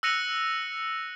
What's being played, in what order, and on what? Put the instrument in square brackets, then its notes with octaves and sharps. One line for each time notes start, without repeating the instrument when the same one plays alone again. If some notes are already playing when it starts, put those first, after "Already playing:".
[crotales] E6 F#6 A#6 C#7 D#7 F7